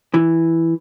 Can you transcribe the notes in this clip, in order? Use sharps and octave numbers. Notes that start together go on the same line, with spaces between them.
E3